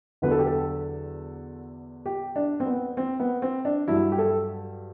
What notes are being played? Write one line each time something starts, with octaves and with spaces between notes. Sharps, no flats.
E2 D3 F#3 B4
A4
G4
A4
G4
D4
C4
B3
C4
B3
C4
D4
G2 F#3 E4
G4
A4